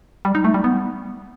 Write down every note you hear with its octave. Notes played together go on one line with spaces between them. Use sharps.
G3
D#4
A3
G3
B3